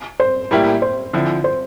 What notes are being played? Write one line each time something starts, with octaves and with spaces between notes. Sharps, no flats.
C5
A2 G3 A#3 E4 G4
C5
D3 F3 C4 E4
C5